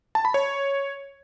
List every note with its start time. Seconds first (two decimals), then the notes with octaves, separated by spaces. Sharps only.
0.15 A5
0.25 B5
0.34 C#5